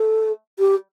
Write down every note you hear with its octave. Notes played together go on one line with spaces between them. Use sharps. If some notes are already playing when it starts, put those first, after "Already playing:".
Already playing: A4
G4